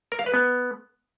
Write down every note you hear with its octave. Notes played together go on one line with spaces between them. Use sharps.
A#4
F5
B4
B3